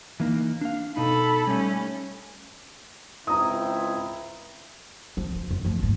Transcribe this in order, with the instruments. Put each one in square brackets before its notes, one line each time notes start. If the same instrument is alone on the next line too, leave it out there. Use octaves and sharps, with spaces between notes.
[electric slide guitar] E3 A#3 D#4
D4 F5
[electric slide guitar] B2 D#4 [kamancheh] A4 B5
[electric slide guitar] G3 A3 [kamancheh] C#4
[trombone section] C#2 C4 E4 [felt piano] A#5 D#6
[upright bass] F3
F4
F#2
F3 A3
G1 G#2